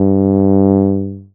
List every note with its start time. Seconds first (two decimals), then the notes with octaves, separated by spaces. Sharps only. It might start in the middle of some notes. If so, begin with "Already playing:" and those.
Already playing: G2